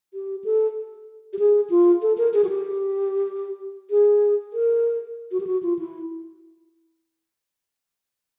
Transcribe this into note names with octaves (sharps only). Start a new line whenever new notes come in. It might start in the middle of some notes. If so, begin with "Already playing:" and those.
G4
A4
G4
G#4
F4
A4
A#4
G#4
F#4
G4
G#4
A#4
F#4
G4
F#4
F4
E4